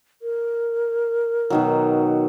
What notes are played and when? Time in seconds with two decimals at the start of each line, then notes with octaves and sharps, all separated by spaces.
0.22 A#4
1.50 B2 D#3 F#3